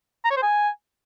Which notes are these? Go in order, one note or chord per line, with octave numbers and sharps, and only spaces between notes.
A#5
C#5
C5
G#5